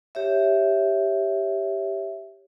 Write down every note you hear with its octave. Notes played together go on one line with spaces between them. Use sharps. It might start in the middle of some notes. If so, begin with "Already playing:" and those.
G4 C#5 E5